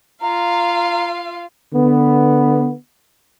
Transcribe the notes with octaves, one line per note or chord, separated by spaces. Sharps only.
F4 F5 A#5
D3 B3